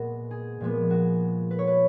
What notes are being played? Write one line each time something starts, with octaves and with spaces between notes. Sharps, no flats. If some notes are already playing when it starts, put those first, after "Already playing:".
Already playing: A#2 G#3 B3 F#4
G#4
A#2 F3 G#3 B3
F#4
B4
C#5
B4